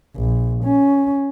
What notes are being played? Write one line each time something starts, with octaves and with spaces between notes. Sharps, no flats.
A#1
C#4